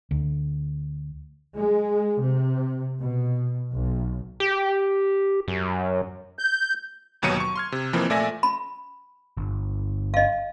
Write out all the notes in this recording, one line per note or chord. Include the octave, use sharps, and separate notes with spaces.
D2
G#3
C3
B2
B1
G4
F#2
G6
G1 D#2 B2 F#3 C#7 D#7
C#6
C6 F6 G#6
C3
F2 E3 F3 A#3 C4
A#2 A3 D5 E5 G#5 A#6
B5
G1
D#5 F5